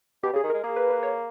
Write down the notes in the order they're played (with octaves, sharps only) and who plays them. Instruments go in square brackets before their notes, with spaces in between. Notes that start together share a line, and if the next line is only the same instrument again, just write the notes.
[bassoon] B2 [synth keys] G4
[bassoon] C#3 [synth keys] G#4
[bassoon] D#3
[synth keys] A#4
[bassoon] G#3
[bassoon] A#3 [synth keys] G#4
[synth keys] B4
B4
C#5